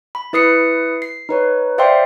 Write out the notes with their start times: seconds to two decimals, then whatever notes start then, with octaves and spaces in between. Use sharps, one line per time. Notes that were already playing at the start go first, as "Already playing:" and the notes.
0.15 B5
0.33 E4 B4 D#6 C7 C#7
1.02 C7
1.29 D#4 B4 C#5
1.78 C5 D5 E5 F5 G5 C6